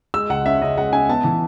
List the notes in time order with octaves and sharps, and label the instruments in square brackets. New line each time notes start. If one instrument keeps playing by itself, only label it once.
[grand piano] G#3 E6
C#2 F#5
C#4 E5
C#3 D#5
G#3 F#5
C#3 G#5
B3 A5
E3